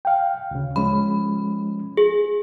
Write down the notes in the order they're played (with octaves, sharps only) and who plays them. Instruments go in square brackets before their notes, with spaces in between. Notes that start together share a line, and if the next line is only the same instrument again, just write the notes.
[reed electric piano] F5 G5
D2 C#3
[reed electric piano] F3 G#3 C#4 [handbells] B5
[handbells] G#4